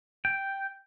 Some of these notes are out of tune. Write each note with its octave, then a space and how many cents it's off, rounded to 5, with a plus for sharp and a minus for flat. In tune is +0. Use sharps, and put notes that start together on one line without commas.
G5 +0